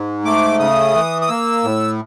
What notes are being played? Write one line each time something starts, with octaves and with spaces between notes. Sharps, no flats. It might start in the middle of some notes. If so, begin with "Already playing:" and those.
Already playing: G#2
A3 D6
C#3 D#6
E3
D#6
A#3 E6
A2